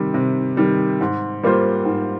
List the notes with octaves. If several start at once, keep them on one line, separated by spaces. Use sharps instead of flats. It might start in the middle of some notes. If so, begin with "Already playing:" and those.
Already playing: C3 D#3 G3
C3
D#3 G3
G#2
G3 A#3 F4 C5
G#2